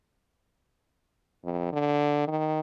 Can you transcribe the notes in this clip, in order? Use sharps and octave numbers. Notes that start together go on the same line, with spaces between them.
F2
D3
D#3